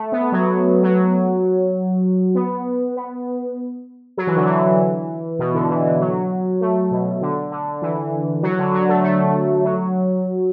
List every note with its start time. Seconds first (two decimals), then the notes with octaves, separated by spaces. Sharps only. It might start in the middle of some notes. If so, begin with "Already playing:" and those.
Already playing: A3
0.12 B3
0.32 F#3
0.83 F#3
2.35 B3
2.96 B3
4.17 F#3
4.27 E3
4.36 D3
4.46 E3
5.39 B2
5.55 D3
5.70 E3
5.85 E3
6.00 F#3
6.61 A3
6.91 B2
7.21 D3
7.52 D3
7.82 E3
8.43 F#3
8.59 D3
8.74 F#3
8.89 A3
9.04 A3
9.64 F#3